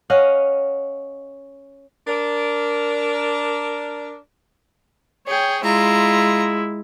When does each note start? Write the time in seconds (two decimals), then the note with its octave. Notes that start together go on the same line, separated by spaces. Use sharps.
0.10 C#4 D#5 F5 F#5
2.07 D4 A#4
5.27 G#4 C#5 G5
5.64 G#3 E4 F4 A#5